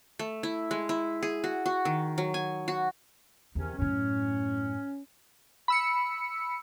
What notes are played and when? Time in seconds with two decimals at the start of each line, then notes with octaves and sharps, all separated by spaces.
0.19 A3
0.43 E4
0.71 G#3
0.89 E4
1.23 G#4
1.44 F#4
1.66 F#4
1.85 D#3
2.18 F#3
2.34 G#5
2.68 F#4
3.55 E2 C3 D#3 C#4
3.78 F#2 A2 C#4
5.68 B5 E6 C#7